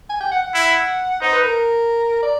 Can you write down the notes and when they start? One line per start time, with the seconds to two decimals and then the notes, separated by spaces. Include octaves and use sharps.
0.10 G#5
0.21 G5
0.32 F#5
0.43 F#5
0.54 E4
1.22 D#4 C5
1.33 B4
1.44 A#4
2.23 D5